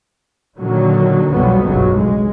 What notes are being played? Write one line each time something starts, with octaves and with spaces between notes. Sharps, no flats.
A#2 D3 D#3 F#3
B1 F2 B2 F#3 G3 B3
F1 B1 G2 C#3 F#3
G#3